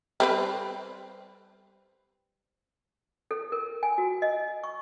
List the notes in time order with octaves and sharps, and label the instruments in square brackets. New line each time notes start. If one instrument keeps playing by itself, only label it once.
[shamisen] G3 C4 B4
[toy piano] A4
A#4
G#5
F#4
D#5
C#6